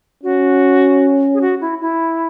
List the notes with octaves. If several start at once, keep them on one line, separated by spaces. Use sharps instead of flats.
C#4 F#4
G#4
F#4
E4
E4